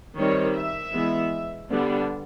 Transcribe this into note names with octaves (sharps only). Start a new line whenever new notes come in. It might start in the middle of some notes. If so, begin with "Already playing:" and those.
D#3 G3 C4 C#5
E5
E3 G#3 B3
D3 G3 B3 D4